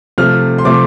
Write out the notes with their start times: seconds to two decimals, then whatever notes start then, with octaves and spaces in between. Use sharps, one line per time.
0.18 C3 F3 A3 F6
0.58 C6
0.65 C3 F3 A3 D6